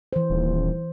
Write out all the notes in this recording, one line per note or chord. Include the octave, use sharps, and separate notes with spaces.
E3 C5
D#1